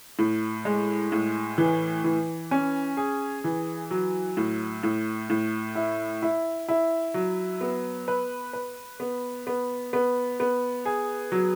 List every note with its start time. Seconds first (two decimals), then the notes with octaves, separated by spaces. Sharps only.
0.19 A2
0.65 G#3
1.12 A2
1.58 E3
2.04 E3
2.51 C#4
2.97 G#4
3.44 E3
3.91 F#3
4.37 A2
4.83 A2
5.30 A2
5.75 E4
6.22 E4
6.68 E4
7.14 F#3
7.61 B3
8.08 B4
8.53 B4
9.00 B3
9.47 B3
9.93 B3
10.40 B3
10.86 G#4
11.32 F#3